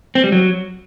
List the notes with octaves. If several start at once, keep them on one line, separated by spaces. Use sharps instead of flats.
C4
G3
F#3